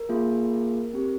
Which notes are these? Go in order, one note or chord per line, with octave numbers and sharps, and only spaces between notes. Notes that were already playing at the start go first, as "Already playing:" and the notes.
Already playing: A#4
A#3 F4 G#4
C4 G4